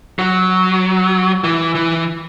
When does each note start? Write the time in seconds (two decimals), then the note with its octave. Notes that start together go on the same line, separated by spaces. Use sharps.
0.19 F#3
1.44 E3
1.75 E3